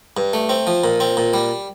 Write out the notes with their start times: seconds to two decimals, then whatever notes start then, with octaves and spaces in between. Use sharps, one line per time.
0.17 G2
0.33 A3
0.49 C4
0.67 F3
0.84 A#2
1.00 C4
1.17 A#2
1.34 G3